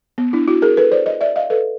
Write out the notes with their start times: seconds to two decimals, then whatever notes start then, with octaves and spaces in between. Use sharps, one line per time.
0.18 B3
0.33 D4 E4
0.47 E4 F#4
0.62 G#4 A#4
0.77 A4 B4
0.92 C5 D5
1.06 C#5 D#5
1.21 D5 E5
1.36 D#5 F5
1.50 A4 B4